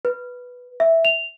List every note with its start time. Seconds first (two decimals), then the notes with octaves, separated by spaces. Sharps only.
0.05 B4
0.80 E5
1.05 F7